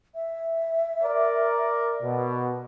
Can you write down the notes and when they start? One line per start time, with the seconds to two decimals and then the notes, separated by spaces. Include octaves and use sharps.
0.15 E5
1.03 A#4 D5
2.03 B2